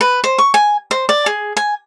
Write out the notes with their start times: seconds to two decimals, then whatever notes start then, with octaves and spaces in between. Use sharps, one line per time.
0.01 B4
0.24 C5
0.38 C#6
0.54 G#5
0.91 C5
1.09 D5
1.26 G#4
1.57 G#5